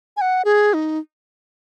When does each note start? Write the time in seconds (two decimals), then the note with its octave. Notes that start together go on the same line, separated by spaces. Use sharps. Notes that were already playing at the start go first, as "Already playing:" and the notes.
0.17 G#5
0.21 F#5
0.45 G#4
0.74 D#4